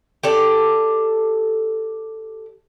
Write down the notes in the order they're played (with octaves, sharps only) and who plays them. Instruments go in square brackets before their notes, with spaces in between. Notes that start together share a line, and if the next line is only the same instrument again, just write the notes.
[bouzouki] G4 A4 D5